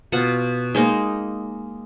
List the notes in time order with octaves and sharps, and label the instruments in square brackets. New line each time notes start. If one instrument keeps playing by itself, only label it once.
[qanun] B2 F4 F#5
G#3 A#3 D#4